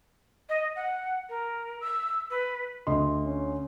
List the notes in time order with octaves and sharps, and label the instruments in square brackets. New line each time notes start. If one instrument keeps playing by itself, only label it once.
[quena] D#5
F#5
A#4
E6
B4
[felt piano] D2 D#5 C6
[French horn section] C#4